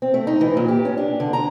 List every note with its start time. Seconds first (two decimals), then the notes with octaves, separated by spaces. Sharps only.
0.02 C4
0.14 A3
0.27 D#4
0.41 E3
0.57 A#2
0.68 G4
0.85 C#4
0.97 D4
1.20 D3
1.33 A#5